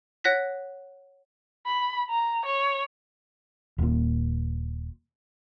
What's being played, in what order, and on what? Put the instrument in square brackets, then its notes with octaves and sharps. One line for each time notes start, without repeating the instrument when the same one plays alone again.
[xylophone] C#5 F#5 F#6 A#6 B6
[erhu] B5
A#5
C#5
[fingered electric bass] D#1 A#2